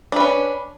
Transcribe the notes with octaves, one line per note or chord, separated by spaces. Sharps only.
C#4 D4 B4